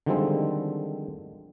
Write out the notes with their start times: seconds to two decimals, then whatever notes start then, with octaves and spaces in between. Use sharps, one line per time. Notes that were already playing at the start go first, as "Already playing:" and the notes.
0.06 D3 D#3 F3 G3 G#3 C4